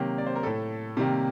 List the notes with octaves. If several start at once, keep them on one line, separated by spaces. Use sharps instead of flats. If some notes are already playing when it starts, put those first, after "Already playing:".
Already playing: C3 D#3 F#3 A#3 G4
D5
C5
A#4
A2 A3 A4
C3 D#3 G3 A#3 G4